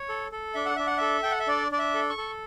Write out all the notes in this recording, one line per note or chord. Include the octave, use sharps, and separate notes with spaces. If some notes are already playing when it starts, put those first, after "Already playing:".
Already playing: C#5
A4
A4
D4 E5
F#5
D4 E5
F#5
A4 E5
A4 G5
F#5
E5
D4 D5
D4 D5
E5
A4
C#6
A4